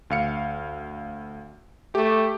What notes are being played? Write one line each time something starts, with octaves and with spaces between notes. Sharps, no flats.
D2 F5 C#7
A3 G4